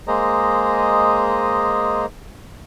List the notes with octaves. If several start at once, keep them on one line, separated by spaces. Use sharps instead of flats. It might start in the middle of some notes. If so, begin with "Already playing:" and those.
G#3 A#3 G#4 C5 D#5 A#5